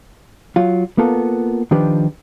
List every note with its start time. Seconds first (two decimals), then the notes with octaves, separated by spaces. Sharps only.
0.56 F#3 F4
0.98 A#3 B3 F4 A4
1.71 D#3 F3 D4 G4 B4